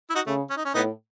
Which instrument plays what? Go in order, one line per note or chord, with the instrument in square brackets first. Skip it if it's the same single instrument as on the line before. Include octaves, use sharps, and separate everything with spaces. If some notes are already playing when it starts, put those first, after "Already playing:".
[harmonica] E4
D#4 F#4
[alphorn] C#3 [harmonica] A3
[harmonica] C#4
D#4
C#4
[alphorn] A2 [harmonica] B3 D#4